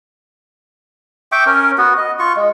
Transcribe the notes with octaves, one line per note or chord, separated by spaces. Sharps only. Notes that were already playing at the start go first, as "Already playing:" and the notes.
E5 G5 C#6 D6
C#4 A#4
B3 F#4 B4
D#5
F4 C#6
G#3